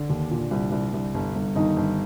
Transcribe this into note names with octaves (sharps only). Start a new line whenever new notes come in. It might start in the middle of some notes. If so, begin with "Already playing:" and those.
Already playing: D3 D4
D#2
A#2
C2
C2
C2
G1
G1
G1 D#3 D#4
G1